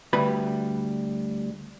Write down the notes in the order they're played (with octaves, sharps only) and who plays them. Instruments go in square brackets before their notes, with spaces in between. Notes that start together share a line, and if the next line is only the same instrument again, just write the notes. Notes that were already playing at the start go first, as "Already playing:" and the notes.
[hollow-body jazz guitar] D2 G3 B4 B5